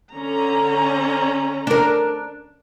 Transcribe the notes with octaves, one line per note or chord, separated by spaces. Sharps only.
D3 C#4 A#5
D4 A#4